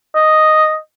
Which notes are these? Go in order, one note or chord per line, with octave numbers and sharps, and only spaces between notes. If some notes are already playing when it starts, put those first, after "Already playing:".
D#5